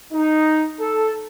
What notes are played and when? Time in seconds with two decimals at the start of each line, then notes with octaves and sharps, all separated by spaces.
0.13 D#4
0.80 A4